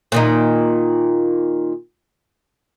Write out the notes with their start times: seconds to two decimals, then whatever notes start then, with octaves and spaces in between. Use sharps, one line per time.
0.12 A#2 D#3 D#4